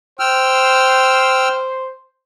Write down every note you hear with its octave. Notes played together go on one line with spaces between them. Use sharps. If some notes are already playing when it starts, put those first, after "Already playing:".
C5 G5 E6 F6